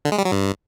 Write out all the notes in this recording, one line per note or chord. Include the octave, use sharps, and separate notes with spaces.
D3
G#3
G3
F#3
G2